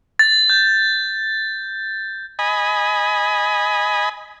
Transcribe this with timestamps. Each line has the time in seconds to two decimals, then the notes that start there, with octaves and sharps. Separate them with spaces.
0.19 A6
0.50 G6
2.39 D#5 G#5 B5